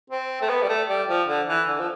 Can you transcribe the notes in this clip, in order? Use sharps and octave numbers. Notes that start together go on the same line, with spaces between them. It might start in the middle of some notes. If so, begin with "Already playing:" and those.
C4
A3
B3
G3
A3
G3
F3
D3
E3
D3
F3